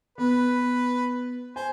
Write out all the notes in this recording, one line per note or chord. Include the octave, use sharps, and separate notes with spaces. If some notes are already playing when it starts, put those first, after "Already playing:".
B3 B4
C5 G#5